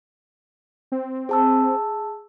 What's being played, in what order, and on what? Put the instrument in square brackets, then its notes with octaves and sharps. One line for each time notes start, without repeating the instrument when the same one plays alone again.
[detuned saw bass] C4
[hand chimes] G#4 A5 E6